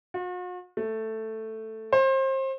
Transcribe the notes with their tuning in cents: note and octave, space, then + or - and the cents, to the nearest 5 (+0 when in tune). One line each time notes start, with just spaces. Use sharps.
F#4 -45
A3 +5
C5 +30